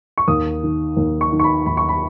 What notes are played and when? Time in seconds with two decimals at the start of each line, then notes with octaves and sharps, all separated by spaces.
0.18 C#6
0.28 D#2 D#6
0.63 D#3
0.97 D#2
1.21 C#6
1.32 D#3
1.40 C#6
1.44 B5
1.66 D#2 B5
1.77 C#6
1.89 B5